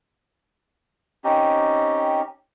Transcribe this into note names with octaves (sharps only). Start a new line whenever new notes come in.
C4 C#4 D#4 G4